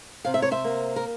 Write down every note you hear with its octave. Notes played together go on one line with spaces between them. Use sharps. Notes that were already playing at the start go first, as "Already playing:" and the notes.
C3 F5
E5
C#5
C5 E5
A#3
A#4